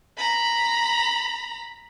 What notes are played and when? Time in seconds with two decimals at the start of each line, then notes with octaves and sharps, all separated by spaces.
0.18 A#5 B5